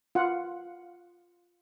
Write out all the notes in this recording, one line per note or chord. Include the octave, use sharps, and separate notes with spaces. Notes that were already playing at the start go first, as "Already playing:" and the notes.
F4 F#5